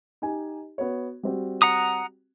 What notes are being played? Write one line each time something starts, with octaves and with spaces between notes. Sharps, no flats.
D#4 G4 G#5
B3 F#4 C#5
G3 C4 F#4
F#5 A#5 D#6